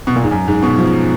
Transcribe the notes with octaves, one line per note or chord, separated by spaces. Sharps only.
B2
A#2
G#2
F#2
G#2
B2
F3